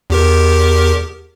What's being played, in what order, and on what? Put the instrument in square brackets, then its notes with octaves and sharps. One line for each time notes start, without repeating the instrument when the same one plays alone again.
[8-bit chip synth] E2 G4 A#4